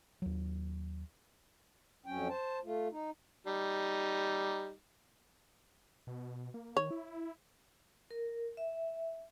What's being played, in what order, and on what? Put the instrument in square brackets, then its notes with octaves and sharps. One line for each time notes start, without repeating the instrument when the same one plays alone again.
[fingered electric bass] D#2 F#3
[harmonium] F2 F#3 C#4 G5
C5 A5
A3 F4
D#4
[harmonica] G3 D#4
[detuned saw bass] B2
A#3
[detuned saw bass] D#3 [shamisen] C#5
[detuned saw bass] E4
[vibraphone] A#4
E5